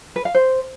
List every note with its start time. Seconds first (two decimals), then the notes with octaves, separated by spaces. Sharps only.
0.16 B4
0.25 F5
0.35 C5